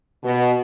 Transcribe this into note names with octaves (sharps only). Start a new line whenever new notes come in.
B2